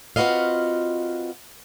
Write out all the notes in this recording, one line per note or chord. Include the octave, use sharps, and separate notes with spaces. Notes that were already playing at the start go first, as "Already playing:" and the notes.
C4 F4 F#4 B4 D#5 F5